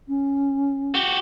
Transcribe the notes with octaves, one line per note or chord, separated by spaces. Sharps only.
C#4
F#4 G4